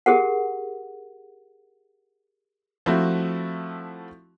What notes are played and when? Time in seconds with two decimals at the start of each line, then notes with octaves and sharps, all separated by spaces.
0.06 G4 G#4 A#4 F#5
2.86 F3 A3 C4 E4 F#4